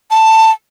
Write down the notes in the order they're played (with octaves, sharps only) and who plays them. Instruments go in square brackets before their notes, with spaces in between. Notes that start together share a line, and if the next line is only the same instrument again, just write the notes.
[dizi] A5